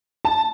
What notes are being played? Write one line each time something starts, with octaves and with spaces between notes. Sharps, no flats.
A5